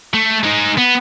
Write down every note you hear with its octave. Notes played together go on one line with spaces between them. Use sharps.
A3
G#3 D#4
B3